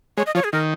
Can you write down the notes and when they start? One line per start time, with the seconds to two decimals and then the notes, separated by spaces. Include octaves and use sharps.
0.17 G#3 C#5
0.26 D#5
0.35 F3 C#5
0.44 G#4
0.53 D#3 A#4